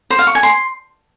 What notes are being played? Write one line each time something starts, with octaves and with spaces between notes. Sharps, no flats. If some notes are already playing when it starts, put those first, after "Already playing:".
C5
F5
C#6
G#5
C6